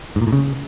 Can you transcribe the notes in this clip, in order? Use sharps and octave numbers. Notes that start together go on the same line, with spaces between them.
G#2
A#2
A2
C#3